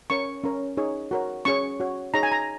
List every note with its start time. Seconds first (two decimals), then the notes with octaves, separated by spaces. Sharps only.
0.10 C#4 A#4 C#5 C#6
0.44 C#4 A#4 C#5
0.77 D#4 G#4 C#5
1.11 F#4 A#4 C#5
1.45 C#4 G#4 C#5 C#6
1.80 F#4 C#5
2.14 D#4 G#4 C#5 A#5
2.23 G#5
2.32 A#5